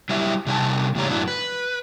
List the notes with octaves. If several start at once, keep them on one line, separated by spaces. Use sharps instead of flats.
F#3 G3 E4 E5
C3 G3 D#4 C5 G#5 A5
E2 A2 C#3 G3 C#5 A#5
F#2 A2 B3 D4 E4 F#4
B4